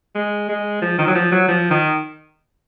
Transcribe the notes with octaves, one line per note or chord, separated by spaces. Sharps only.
G#3
G#3
F3
D#3
F#3
F3
F#3
F3
D#3